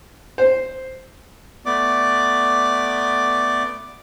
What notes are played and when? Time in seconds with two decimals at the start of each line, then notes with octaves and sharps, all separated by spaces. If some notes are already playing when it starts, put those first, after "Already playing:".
0.38 C5
1.66 A3 B3 D5 D6